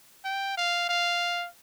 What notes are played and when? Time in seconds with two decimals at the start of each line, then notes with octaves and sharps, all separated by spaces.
0.25 G5
0.58 F5
0.89 F5